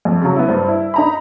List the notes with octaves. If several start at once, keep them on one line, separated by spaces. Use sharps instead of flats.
F2
C#3 F#3
B3 E4
G2 C5
E4
D#4 A#5 B5